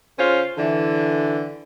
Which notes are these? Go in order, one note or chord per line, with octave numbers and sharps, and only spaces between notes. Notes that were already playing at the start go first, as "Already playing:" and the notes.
C#3 C#4 F4 C5
D3 E3